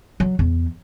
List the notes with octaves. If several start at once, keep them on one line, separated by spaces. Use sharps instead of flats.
F#3
E2